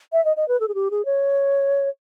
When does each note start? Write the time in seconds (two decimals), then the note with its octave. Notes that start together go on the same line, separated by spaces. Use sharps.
0.13 E5
0.25 D#5
0.37 D#5
0.48 B4
0.60 A4
0.68 G#4
0.75 G4
0.91 G#4
1.05 C#5